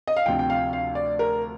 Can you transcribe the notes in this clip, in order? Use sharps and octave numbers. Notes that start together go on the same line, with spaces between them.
D#5
F5
D2 C3 F3 G5
G5
F5
F5
D5
A#4